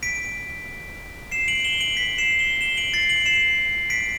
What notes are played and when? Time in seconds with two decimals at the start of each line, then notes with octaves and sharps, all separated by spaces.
0.03 B6 D7
1.31 C7 E7
1.48 D7 F#7
1.64 E7 G7
1.80 D7 F#7
1.97 B6 D7
2.18 C7 E7
2.39 E7 G7
2.61 E7 G7
2.77 D7 F#7
2.94 A6 C7
3.09 D7 F#7
3.26 C7 E7
3.90 B6 D7